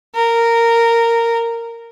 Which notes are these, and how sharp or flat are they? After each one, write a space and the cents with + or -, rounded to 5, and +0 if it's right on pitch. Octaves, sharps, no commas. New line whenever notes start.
A#4 -10